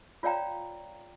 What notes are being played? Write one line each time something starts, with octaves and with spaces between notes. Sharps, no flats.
F4 C#5 D5 F5 G5 A#5